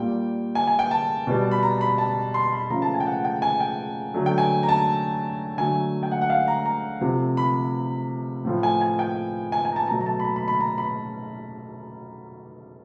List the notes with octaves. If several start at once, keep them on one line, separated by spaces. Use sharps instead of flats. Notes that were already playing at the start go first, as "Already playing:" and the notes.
Already playing: A#2 G3 G5
G#5
G#5
G5
A5
B2 G3
B5
A#5
B5
A5
C6
B5
C#3 F3 A3 A#5
A5
G#5
G5
F#5
G5
G#5
G5
D3 F#3 A3
G5
G#5
A#5
A5
D3 F#3 A3 G#5
G5
F#5
F#5
F5
A#5
A#5
C3 F3 A3
B5
A2 F3 A3
G#5
G#5
G5
G#5
G#5
A#5
A5
B2 F#3 A3 A#5
A#5
A5
B5
A#5
B5
B5
A#5
B5